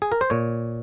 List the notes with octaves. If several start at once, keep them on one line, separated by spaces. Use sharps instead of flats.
G#4
A#4
C5
A#2 C#5